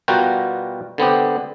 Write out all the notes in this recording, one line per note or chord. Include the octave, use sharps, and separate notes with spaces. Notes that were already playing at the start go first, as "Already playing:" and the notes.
B2 G3 F4 F#4 A#4 G5
D3 B3 C4 G4